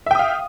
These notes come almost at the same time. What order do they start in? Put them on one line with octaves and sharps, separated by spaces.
E5 G5 D#6 F5